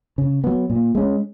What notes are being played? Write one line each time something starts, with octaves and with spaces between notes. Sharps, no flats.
C#3
F#3 B3
A#2
G#3 C#4